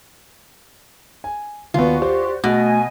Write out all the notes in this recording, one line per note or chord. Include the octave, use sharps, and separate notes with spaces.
G#5
D#2 B3 F4 F#4 D5
G4 C5
B2 A3 F#4 D#5 G#5